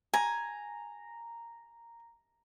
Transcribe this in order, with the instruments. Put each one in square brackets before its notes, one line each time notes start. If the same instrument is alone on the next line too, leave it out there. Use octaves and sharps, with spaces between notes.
[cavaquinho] G#5 [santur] A#5